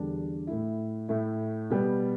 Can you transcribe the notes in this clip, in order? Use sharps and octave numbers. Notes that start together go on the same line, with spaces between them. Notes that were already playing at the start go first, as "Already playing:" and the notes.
Already playing: E2 D3 G3 D4
A2 A3 E4
A2 A3 E4
B2 G3 B3